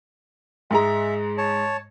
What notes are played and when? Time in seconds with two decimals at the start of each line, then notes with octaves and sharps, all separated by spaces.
0.71 G#2 G#3 E5 A#5
1.38 C#5 A5